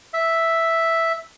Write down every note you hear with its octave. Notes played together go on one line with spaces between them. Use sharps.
E5